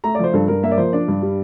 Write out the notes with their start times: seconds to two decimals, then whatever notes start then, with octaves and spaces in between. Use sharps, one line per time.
0.04 A3 A#5
0.15 D5
0.19 F3 C5
0.33 G2 A4
0.48 G2 A#4
0.63 A#3 E5
0.71 D5
0.77 F3 C5
0.93 D4 D5
1.08 G2
1.22 G3